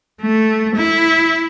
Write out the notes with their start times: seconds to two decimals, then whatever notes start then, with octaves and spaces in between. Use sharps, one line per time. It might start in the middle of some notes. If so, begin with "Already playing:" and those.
0.21 A3
0.76 E4